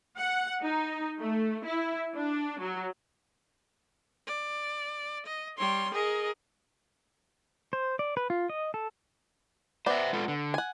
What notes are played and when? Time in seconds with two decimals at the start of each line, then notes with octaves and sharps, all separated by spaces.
0.17 F#5
0.62 D#4
1.20 A3
1.66 E4
2.15 D4
2.61 F#3
4.27 D5
5.26 D#5
5.58 G3 C#5 C6
5.94 G#4 A#4 D#5
7.73 C5
7.99 D5
8.17 B4
8.30 F4
8.49 D#5
8.74 A4
9.86 B3 C5 D5 E5
10.13 G#3 F4 A4
10.28 D3
10.54 F#5 G#5